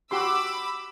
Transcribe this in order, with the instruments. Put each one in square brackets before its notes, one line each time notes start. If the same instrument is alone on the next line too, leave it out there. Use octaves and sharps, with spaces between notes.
[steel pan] F#4 G4 C6 [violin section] B5 D6 E6